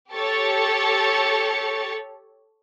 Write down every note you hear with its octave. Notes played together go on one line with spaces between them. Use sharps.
G4 A4 C#5 A6 C#7